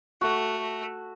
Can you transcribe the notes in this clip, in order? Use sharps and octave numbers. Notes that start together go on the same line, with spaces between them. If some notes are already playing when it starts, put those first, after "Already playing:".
A3 F#4